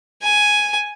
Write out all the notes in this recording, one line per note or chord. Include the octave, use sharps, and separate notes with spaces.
G#5